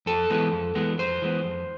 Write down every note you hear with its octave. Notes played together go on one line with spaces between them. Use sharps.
F2 A4
E3 G#3 B3
F2
E3 G#3 B3
F2 C5
E3 G#3 B3
F2